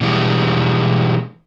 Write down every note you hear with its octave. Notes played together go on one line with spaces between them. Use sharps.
B2 E3 G3 G#3